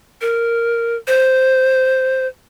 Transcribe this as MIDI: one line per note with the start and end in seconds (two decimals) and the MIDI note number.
0.21 0.96 70
1.08 2.27 72